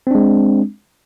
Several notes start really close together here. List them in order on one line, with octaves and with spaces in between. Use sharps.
C4 D4 G#3